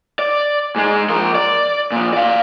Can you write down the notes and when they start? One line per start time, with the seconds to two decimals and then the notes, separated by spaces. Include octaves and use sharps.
0.19 D5
0.76 G#2 G#3
1.09 F3 A#4
1.35 D5
1.91 A#2 F3
2.13 D5 F5